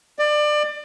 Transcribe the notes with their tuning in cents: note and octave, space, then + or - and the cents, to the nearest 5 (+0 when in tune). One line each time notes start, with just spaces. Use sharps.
D5 +25